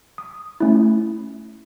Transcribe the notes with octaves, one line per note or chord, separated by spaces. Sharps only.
D#6
A3 C#4 E4